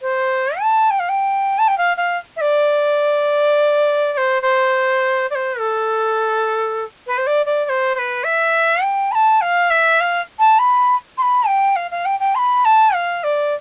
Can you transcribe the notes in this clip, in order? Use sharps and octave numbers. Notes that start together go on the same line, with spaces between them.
C5
A5
G5
F5
G5
A5
G5
F5
F5
E5
D5
D5
C5
C5
D5
C5
A4
B4
C5
D5
D5
D5
C5
C5
B4
E5
G5
B5
A5
F5
E5
F5
A5
B5
C6
B5
G5
F5
F5
G5
G5
C6
B5
A5
F5
D5